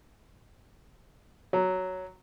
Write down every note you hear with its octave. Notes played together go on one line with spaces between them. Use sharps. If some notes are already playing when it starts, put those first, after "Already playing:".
F#3